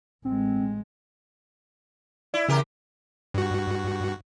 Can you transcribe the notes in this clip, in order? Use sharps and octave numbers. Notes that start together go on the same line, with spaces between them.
A1 G#3 C4
E4 D5
E2 C#3 G4 A#4
G2 F#4